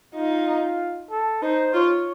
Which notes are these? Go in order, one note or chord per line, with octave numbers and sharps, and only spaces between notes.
D#4 F4
A4
D#4 C5
F4 C#5